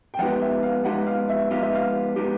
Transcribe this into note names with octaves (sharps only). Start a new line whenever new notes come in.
G5
F3 G#3 B3 D#4 G4 F#5
E5
F5
F3 G#3 B3 D#4 G4 F#5
F5
E5
F3 G#3 B3 D#4 G4 F5
E5
F5
F3 G#3 B3 D#4 G4